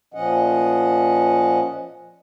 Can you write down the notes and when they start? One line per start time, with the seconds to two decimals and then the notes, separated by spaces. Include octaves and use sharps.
0.14 A#2 F3 C#4 D#5 F#5